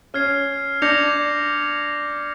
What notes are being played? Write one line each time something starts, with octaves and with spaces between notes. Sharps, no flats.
C#4 F6 G#6 C7
D4 D6 G6 A#6 C#7 F7